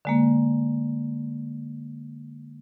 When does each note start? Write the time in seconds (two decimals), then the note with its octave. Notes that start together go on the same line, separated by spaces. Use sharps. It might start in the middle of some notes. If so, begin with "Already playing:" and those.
0.05 D3 G#3 A#3